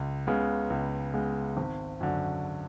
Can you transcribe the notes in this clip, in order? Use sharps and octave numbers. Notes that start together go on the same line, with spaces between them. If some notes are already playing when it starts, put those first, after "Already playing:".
Already playing: C#2
C#3 G#3 B3
C#2
C#3 G#3 B3
G#1
F#2 D3